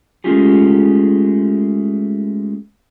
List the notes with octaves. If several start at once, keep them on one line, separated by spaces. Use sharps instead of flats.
G#3 A3 C#4 F4 G4 G#4